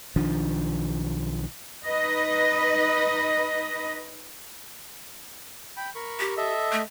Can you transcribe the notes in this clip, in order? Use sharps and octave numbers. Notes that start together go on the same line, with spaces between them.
B1 D#3 F3 D4
D#4 B4 D#5
G5 B5
A#4 B5 C#6
G4
A4 D#5 E5
A3